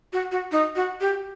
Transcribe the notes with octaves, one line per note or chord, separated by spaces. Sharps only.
F#4
F#4
D#4
F#4
G4